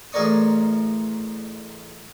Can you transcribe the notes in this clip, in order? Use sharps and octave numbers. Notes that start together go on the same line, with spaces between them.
A1 G#4 A#4 D5 C#6 D#6